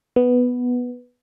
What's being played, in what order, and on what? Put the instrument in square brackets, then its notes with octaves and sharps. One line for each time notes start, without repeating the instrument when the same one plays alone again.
[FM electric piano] B3